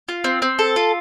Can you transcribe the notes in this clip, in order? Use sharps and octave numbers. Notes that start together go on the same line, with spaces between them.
F4
C4
C4
A4
F4